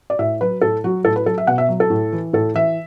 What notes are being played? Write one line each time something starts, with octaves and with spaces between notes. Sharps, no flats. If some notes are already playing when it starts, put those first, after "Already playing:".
D5
A2 E5
F#3 B4
A2 A4
F#3 F#4
A2 A4
B4
F#3 A4
E5
B2 F#5
E5
F#3
A4
A2
E3
A2 A4
E3 E5